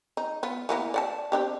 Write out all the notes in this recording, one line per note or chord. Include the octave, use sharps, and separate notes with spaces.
D#4
B3 F4
E3 A#3 B3
D5 F#5 A5
C4 D4 G4